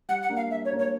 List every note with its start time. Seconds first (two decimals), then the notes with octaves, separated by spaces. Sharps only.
0.09 G3 F#5
0.22 F#5
0.30 A#3 D4
0.37 F5
0.50 G3 E5
0.65 C#5
0.72 A#3 D4
0.79 C#5